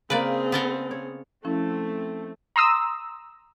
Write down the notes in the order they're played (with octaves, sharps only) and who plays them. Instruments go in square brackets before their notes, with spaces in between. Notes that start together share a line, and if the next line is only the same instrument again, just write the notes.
[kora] C#3 A#3 [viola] C4 G#4 [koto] B4 D5
[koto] B3 A4 A#4
[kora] C#5
[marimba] F3 C#4 E4 [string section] A3 C4
[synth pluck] A#5 C6 D#6 E6